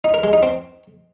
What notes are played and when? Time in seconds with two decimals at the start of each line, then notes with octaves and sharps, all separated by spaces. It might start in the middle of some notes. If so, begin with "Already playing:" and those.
0.04 D#4
0.14 A#4
0.24 G#3
0.33 D#4
0.43 C4